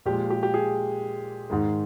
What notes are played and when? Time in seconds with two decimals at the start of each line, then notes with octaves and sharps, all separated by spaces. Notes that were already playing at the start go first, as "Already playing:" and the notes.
0.06 A#2 F3 G#3 G4
0.30 G4
0.43 G4
0.54 G#4
1.50 G#2 D#3 G#3